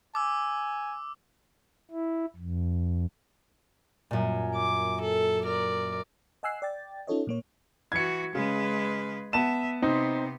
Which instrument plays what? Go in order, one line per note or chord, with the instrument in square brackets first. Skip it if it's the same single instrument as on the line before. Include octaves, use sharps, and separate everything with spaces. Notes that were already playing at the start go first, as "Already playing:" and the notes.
[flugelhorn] G#5 [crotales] D6 E6
[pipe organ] E4
F2
[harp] F#2 A#2
[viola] D6
A4
A#4 D5
[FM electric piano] D#5 F#5 G#5 E6 F#6 C7
D5 G5 A6
C#4 D#4 F4 A4 C#5 D#5
A#2 A#3 C#5
[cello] E3 F#4 [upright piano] G#6 C#7
[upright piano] C#3 [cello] G#3 B4
[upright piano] B3 A5 E7 [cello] E5
[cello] C3 B3 [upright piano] C4 D#4